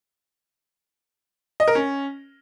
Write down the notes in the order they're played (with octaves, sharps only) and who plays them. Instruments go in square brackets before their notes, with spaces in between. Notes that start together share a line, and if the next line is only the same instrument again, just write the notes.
[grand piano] D#5
A#4
C#4